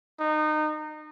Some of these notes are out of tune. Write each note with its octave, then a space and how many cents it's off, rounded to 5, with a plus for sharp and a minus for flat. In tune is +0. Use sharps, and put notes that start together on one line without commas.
D#4 -25